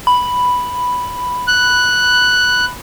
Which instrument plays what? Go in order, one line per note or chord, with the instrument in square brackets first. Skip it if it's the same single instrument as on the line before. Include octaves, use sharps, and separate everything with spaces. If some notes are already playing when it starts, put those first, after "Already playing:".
[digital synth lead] B5
[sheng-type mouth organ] F#6